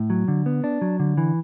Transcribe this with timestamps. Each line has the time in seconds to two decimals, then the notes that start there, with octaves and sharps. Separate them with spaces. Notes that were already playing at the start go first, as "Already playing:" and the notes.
Already playing: A2
0.10 F#3
0.28 D3
0.46 B3
0.64 D4
0.82 F#3
1.00 D3
1.17 E3